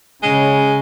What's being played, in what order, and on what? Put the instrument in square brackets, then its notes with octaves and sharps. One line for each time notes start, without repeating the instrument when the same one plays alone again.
[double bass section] C#3 [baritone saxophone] G#3